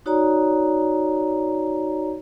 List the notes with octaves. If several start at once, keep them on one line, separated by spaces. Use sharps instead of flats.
D#4 F#4 C#5 D5 A#5